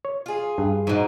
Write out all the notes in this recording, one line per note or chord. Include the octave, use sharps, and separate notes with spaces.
C#5
F4 G#4
G2
G#2 B2